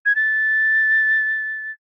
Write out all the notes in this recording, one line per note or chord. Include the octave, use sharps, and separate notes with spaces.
G#6
A6